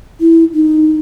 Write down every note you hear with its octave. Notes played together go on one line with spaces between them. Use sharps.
E4
D#4